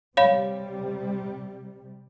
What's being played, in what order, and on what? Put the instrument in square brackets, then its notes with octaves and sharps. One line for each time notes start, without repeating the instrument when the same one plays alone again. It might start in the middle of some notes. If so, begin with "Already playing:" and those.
[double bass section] C3 G3 [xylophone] C#5 F5 B5